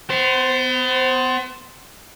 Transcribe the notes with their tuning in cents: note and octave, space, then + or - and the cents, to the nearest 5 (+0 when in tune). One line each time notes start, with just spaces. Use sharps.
B3 +35 C5 +0